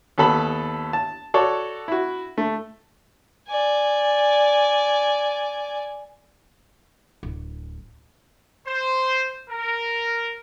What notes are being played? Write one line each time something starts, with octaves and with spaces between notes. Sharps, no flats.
D#2 B3 A4 B5
A5
F#4 A4 C#5 D5
E4 F#4
A3
D5 G#5
D1
C5
A#4